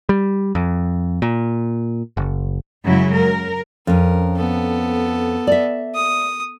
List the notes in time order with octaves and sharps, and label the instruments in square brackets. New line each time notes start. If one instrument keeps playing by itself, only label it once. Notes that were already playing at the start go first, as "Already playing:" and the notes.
[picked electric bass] G3
F2
A#2
F#1
[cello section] F#2 C#3 F#3 G#3 E4
A#4
[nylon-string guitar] F2 C#4 [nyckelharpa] A#4
[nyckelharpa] B3 A4
[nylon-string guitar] D5 E5
[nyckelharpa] D#6